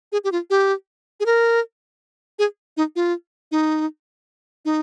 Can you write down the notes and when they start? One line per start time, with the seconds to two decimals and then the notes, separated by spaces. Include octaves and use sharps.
0.12 G#4
0.24 G4
0.32 F4
0.50 G4
1.20 G#4
1.26 A#4
2.39 G#4
2.77 D#4
2.96 F4
3.52 D#4
4.65 D#4